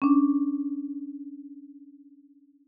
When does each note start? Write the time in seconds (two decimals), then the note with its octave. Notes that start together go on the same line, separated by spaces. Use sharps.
0.02 C#4 D4